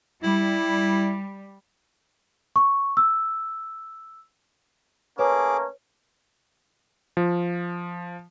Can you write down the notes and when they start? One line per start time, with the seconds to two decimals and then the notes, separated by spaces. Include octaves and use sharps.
0.23 G3 E4
2.56 C#6
2.97 E6
5.19 A3 A#3 C#4 G#4 B4 C#5 D6
7.17 F3